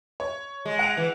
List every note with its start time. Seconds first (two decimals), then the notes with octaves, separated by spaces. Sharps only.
0.20 C#5
0.65 G#3
0.79 F#5 D7 F7
0.97 E3